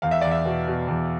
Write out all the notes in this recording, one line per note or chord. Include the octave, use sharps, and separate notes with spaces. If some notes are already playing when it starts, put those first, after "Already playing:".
E2 F5
E5
E2 D5
E5
B2
B2
E2